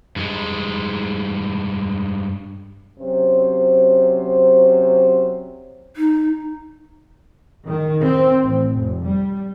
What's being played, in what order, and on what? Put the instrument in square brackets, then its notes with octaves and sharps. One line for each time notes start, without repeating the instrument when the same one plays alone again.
[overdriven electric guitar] G2 G#3
[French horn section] C3 F#3 C#4 C5
[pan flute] D#4
[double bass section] D#3
C4
A1
F1
G3